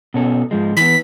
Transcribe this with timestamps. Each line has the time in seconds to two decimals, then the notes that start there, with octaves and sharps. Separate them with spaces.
0.14 B2 C#4 A4
0.51 G#2 F3 G#3
0.77 E3 B3 B6